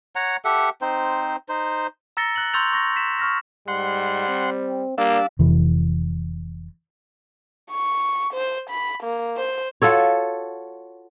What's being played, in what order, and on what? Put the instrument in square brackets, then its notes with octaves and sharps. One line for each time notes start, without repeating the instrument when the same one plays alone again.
[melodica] C#5 F#5 A#5
G4 A4 E5 F#5
C4 D#4 C5
D#4 C5
[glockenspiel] A#5 E6 A6 A#6 C#7 G7
F#6 F#7
C6 C#6 E6 G6 A6 F7
C#6 A#6
B6 E7
C#6 F6 A#6
[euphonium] G#2 [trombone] G3 [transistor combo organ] F#5 C6
[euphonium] C4
[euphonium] G3 [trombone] A#3 [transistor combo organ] D4 E6 [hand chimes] F5
[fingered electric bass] F1 E3
[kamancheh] C#6
C5
B5
A#3
C5
[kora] F4 F#4 A4 C#5